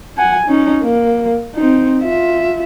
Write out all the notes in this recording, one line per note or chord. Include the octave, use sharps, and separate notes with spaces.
F#5 G#5
C#4 D#4
A#3
C4 D#4
F4 E5